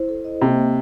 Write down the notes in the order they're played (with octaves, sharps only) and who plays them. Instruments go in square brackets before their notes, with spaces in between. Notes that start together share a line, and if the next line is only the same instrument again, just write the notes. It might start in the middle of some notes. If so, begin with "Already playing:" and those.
Already playing: [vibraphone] E4 C5
A4
D#5
[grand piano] C3 [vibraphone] A#3
[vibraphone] A#3